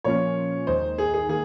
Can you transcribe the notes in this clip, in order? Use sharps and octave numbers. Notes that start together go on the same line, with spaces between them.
A#2 F3 A#3 C#4 F4 C#5
D#2 D#3 G#3 D#4 C5
G#4
G#4
D#3 A#3 G#4